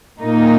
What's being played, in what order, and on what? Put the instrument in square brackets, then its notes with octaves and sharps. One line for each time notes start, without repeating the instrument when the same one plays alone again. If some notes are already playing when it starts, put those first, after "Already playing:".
[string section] A#2 A#3 D#4